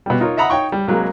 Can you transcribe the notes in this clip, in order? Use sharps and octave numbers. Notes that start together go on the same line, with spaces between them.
B2 G3
D#4 F4 A#4 C#5
D#5 E5 F#5 A#5 B5 D#6
D#4 C#5 G5 C#6
G3
C2 F#3 G#3 A#3